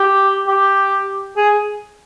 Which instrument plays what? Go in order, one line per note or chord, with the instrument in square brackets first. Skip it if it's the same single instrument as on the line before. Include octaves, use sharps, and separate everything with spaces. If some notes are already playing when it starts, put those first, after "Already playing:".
Already playing: [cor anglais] G4
G4
G#4